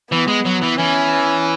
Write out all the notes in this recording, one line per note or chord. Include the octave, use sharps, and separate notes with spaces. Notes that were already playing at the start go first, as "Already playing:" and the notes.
E3 B3
G#3
F#3
E3
E3 C#4